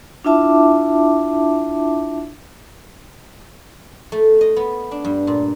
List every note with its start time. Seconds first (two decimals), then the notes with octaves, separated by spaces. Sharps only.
0.25 D4 E4 F4 E5 A5 D6
4.12 A3
4.41 D#5
4.56 B3
4.91 D4
5.05 G2
5.27 A#2